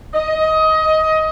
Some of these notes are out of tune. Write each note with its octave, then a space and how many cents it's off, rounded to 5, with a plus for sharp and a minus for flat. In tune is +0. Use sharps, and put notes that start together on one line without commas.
D#5 +20